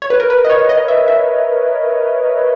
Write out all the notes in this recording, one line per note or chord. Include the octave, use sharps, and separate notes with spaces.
C#5
B4
A#4
B4
D#5
C#5
D#5
E5
E5